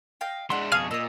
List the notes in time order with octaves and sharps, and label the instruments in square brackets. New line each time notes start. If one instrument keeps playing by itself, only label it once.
[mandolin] D#5 F5 G5
[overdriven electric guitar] G#3 D4 [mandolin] E4 F#5 [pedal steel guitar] C6
[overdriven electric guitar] F2 B2 [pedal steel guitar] G#4 [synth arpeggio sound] F5 F6 D#7 [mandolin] A5 C#6
[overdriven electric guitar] A#2 [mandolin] A#4 D#6 [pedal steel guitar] D#5 E6